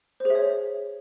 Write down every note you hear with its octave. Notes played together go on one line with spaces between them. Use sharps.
C5
G#4
E5
C#5